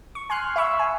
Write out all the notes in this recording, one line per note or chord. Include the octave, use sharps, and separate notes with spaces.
C#6
G#5 C6 F6 F#6
E5 B5 C#6 E6
G#5